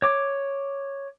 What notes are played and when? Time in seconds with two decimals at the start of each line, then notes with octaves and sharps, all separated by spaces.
0.02 C#5 D6